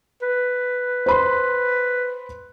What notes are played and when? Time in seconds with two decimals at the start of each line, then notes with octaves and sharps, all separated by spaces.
0.22 B4
1.06 C5 B5 C6